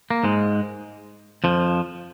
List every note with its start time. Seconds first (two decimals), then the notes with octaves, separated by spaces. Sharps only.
0.11 A#3
0.24 G#2 G#3
1.44 F2 F3